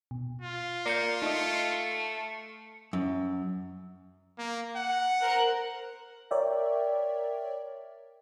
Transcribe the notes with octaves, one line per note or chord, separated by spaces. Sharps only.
B2
F4
A#3 D5 F5 G6 C7 C#7
A3 D#4 D#5
F#2
A#3
F#5
A#4 C5 F#6
A#4 C#5 D5 E5 G5